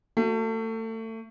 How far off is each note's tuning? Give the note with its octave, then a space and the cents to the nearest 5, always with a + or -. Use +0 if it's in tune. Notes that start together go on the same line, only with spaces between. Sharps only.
A3 +30 F#4 +0